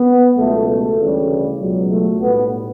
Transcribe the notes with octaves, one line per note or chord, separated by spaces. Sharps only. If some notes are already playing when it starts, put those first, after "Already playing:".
Already playing: B3
C#2 B2 F#3 A3
A3
D2 C#3 E3 G3
C#2 B2 F#3
A3
B1 A2 G3 B3